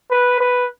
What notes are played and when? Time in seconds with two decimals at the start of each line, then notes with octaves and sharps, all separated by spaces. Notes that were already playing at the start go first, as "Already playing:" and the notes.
0.11 B4
0.40 B4